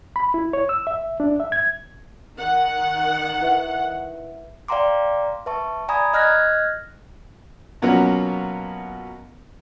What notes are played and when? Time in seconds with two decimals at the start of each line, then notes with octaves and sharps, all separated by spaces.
0.16 B5
0.34 E4
0.53 C#5
0.69 E6
0.87 E5
1.20 D4
1.40 E5
1.52 G#6
2.37 D#3 F#5
3.41 E4 B4 E5
4.68 D5 F5 G5 A#5 C6 D6
5.46 B4 E5 A5 C#6
5.88 D5 G#5 A#5 B5 D#6 G#6
6.14 D#5 F6 F#6 G#6 A#6
7.82 B2 F#3 A#3 B3 C#4 F4